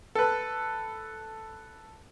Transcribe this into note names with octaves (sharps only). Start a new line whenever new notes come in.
A4 B4